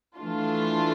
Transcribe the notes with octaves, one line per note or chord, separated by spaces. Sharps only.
E3 A3 D4 F4